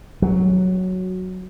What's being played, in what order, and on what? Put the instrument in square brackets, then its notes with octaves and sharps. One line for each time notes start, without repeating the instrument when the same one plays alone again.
[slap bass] F#3